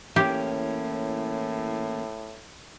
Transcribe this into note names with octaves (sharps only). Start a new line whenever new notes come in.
A2 E3 A#3 C#4 G4